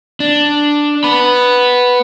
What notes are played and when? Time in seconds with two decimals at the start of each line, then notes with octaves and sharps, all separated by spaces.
0.20 D4
1.04 B3 B5